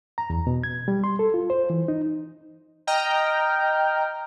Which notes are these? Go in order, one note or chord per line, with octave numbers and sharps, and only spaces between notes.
A#5
E2
B2
G#6
G3
C6
A4
F4
C5
E3
D#4
D#5 G5 A#5 F6